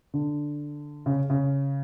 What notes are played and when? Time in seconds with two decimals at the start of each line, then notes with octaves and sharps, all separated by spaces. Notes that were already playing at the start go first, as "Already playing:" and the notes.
0.14 D3
1.06 C#3
1.30 C#3